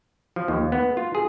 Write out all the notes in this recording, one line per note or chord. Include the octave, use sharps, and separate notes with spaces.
F3
D#2
B3
F4
G#4